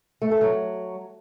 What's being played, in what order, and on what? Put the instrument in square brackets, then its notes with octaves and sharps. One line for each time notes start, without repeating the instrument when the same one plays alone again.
[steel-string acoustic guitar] A3
A4
F#3